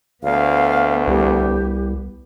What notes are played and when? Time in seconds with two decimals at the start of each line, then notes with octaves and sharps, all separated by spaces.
0.24 D2 B3 F5
1.08 C2 G4